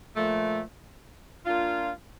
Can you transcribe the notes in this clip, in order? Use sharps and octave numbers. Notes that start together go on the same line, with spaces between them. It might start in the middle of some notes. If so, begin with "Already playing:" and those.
A#2 F3 A3
A#3 D4 F4